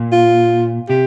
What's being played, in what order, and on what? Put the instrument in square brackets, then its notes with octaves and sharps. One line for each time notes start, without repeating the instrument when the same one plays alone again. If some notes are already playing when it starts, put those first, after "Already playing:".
Already playing: [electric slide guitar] A#2
[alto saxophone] F4
[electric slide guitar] C3 [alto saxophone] G4